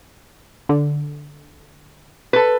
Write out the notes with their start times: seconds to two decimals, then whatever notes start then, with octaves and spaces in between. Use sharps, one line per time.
0.69 D3
2.33 A4 B4